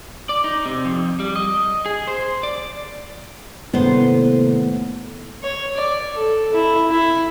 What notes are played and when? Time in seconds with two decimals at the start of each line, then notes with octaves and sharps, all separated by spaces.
0.29 D5
0.44 D#4
0.66 C3
0.85 F2
1.20 G3
1.36 D#5
1.86 G#4
2.08 C5
2.43 D5
3.73 A2 C3 D#3 A#3 B3 C5
5.43 C#5
5.76 D5
6.15 A4
6.53 E4
6.90 E4